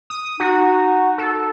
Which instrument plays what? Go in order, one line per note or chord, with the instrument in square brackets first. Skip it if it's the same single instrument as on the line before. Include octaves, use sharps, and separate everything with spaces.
[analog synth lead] D#6
[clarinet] D#4 [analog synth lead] F#4
[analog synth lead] A4